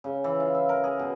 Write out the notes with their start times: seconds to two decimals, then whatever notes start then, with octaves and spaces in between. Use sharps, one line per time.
0.04 C#3
0.24 E3
0.40 F4
0.55 E5
0.69 A#4
0.84 G#4
0.99 B2